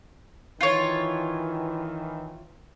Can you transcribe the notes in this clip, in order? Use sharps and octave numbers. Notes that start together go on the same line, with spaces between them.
D#3 E3 F4 C#5